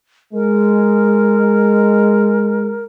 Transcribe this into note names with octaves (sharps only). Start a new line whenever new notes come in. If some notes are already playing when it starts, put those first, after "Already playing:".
G#3 A#4